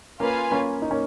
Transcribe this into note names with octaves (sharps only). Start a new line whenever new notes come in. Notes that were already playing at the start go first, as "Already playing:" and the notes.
A#3 C#4 F4 B4 F5 G#5
A#3 C#4
D#4
A#3 C#4